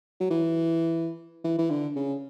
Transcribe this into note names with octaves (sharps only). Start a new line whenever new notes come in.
F#3
E3
E3
E3
D3
C#3